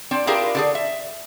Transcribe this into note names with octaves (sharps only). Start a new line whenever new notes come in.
C4 D4
D4 E4 F4 G4 G#4 A#4
D3 D4 G#4
E5